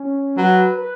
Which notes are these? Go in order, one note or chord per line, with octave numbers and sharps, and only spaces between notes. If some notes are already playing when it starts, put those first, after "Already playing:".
Already playing: C#4
F#3 B4
B4